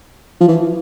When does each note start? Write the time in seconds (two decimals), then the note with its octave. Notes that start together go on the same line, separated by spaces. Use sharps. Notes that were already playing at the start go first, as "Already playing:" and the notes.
0.41 F3
0.49 E3